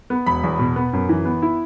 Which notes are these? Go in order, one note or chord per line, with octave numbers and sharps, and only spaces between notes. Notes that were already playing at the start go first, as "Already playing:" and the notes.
B3
E1 B5
E2
B2
B3
F#2
E3
B3
E4